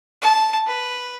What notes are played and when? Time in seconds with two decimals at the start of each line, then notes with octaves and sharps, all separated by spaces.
0.22 A5
0.67 B4